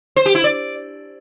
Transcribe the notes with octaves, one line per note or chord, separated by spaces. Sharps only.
C5
G4
E4
D5